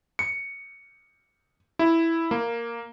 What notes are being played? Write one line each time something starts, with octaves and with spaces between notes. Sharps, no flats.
C#7
E4
A#3